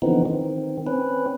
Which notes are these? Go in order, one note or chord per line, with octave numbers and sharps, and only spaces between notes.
D3 E3 F3 B3 C4 D#4
D#3 C4
C4 C#4 B4